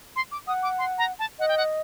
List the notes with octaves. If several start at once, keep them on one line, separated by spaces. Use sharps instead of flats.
C6
D6
F#5 D#6
D6
C6
A#5
A5
D#5 F#5
G5
F#5